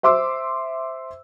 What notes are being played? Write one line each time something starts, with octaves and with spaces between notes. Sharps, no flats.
C5 E5 C6 D6 E6